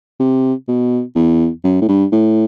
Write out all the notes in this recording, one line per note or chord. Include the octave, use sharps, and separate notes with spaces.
C3
B2
E2
F#2
A2
G2
A2